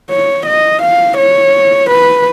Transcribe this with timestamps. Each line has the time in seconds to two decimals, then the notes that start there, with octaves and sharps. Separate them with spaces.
0.10 C#5
0.46 D#5
0.82 F5
1.17 C#5
1.90 B4